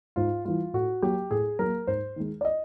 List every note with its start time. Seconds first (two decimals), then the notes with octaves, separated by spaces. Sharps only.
0.16 G#2 F4
0.45 E3 G3 F4
0.74 A2 F#4
1.02 F#3 A#3 G4
1.31 A2 G#4
1.59 F#3 A#3 A#4
1.87 G#2 C5
2.16 D#3 G#3
2.41 D5
2.45 D#5